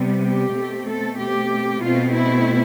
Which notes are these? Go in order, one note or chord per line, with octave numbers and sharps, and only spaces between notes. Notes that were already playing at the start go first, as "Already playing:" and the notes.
Already playing: C3 G3 B3
G4
B2 A3 C4
A4
G4
B2 A3 C4 F4
E4